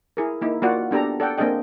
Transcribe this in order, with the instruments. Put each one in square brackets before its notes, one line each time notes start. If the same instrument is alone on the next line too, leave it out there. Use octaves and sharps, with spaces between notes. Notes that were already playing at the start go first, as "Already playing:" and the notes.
[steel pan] E4 G#4 A#4
A#3 D#4 E4
A#3 F4 F#4 D5 F#5
B3 D4 G4 A4 A#5
A4 D5 F#5 G5
A#3 C4 D4 G#4 D#5 G5